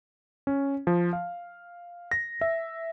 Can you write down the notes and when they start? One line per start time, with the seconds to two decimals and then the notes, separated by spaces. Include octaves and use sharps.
0.47 C#4
0.87 F3
1.13 F5
2.11 A#6
2.41 E5